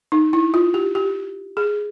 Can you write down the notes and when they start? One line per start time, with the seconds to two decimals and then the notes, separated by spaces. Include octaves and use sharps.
0.12 D#4
0.33 E4
0.54 F4
0.74 G4
0.95 G4
1.57 G#4